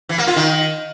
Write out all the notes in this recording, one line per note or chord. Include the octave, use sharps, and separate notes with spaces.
E3
A#3
F4
D#3